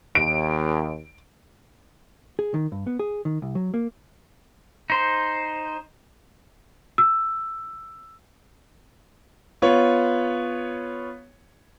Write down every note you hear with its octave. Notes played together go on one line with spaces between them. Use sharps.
D#2 D7
G#4
D#3
G2
B3
G#4
D#3
C2
F#3
A#3
D#4 C5
E6
B3 F4 C#5